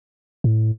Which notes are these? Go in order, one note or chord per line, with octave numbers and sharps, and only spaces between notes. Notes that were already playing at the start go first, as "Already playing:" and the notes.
A2